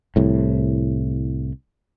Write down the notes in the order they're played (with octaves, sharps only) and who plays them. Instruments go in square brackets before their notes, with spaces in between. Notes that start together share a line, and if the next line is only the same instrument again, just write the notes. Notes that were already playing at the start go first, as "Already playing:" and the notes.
[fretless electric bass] C2 A2